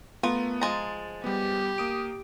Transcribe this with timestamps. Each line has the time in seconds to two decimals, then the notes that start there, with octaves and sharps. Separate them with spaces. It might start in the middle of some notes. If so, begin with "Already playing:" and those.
0.23 A3 B3 F4 A#4
0.61 F3 G#3 A#5 A6
1.24 G3 B3 G4
1.78 A#3 D#6 D7